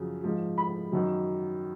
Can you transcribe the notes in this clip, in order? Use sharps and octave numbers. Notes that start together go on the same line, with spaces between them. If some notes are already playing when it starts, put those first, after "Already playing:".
Already playing: F#2 C#3 F3
G#2 F3
B5
F#2 D#3 F#3